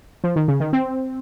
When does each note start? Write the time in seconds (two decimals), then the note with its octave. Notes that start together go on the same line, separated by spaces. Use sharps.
0.24 F3
0.36 D#3
0.48 C#3
0.60 D#3
0.73 C4